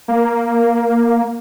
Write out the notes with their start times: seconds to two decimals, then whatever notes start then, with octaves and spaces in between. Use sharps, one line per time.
0.08 A#3